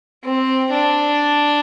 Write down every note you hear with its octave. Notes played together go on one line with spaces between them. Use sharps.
C4
D4